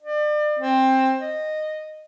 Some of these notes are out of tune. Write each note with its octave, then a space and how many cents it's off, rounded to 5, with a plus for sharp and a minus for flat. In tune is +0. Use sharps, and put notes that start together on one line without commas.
D5 +35
C4 +15
D#5 -10